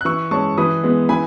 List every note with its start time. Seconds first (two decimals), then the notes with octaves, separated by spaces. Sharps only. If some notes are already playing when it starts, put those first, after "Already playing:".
0.01 F#6
0.05 E3 C#6 E6
0.31 G#3 C#4 A5 C#6
0.58 E3 B5 D#6
0.83 G#3 B3
1.09 E3 G#5 B5